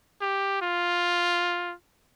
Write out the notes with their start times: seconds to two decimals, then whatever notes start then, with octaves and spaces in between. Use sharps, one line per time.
0.21 G4
0.62 F4